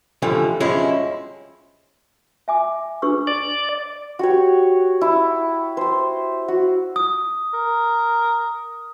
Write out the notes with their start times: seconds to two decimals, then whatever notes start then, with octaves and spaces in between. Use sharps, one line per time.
0.22 B2 D3 E3 F3 G3 A3
0.60 G2 B2 F3 G#3 C#4 E4
2.48 E5 G#5 D6
3.02 D4 G#4 B4 C#6 E6
3.27 D5
4.19 F#4 G4 C#5
5.01 E4
5.77 C5 C6
6.48 F#4
6.96 D#6
7.54 A#4